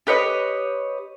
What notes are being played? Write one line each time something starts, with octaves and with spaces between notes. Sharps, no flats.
G4 B4 C#5 D#5